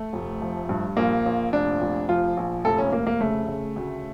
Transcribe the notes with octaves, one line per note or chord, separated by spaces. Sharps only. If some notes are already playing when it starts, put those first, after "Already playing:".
Already playing: A3
F1
F3
G2
A#1 A#3
A#1
F1 D4
F1
F3 F4
A#1
F1 A4
C#4
F1 A#3
A#3
C#3 A3
C#3
D2